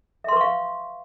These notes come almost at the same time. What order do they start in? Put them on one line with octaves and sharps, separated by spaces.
E5 C6 B4 C#6 F5